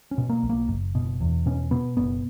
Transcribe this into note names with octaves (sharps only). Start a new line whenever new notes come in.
C#4
B2
A#3
B1
A#3
F#1
B2
E2
B2 C#4
B2 B3
F#1 B3